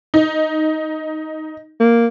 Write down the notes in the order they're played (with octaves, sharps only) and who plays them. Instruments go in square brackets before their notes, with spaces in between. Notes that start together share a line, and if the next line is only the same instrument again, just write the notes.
[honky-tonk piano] D#4
[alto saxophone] A#3